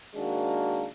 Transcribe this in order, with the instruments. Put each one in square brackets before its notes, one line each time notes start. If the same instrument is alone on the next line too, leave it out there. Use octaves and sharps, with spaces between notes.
[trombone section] D#3 G#3 A#3 D4 F#4